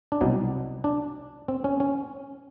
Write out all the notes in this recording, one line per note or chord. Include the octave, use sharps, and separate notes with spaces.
D4
C2 B2 F#3 D#4
D4
C4
C#4
C#4